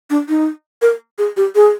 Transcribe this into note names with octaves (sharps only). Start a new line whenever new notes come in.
D4
D#4
A#4
G#4
G4
G#4